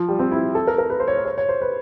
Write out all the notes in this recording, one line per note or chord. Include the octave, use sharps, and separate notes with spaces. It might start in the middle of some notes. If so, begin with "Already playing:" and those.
Already playing: F3
G3
C4
E4
A4
A#4
A#4
B4
C5
C#5
C5
C#5
C#5
C5
B4